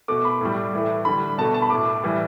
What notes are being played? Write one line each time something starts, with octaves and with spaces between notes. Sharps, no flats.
B2 A3 D6
B5
A2 G3
A2 E3 A3
D3 G3 B5
B2 A3 A5
A5
B5
A2 A3 D6
A2 E3 G3